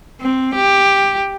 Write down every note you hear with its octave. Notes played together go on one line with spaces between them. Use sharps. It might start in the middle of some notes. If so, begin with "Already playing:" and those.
C4
G4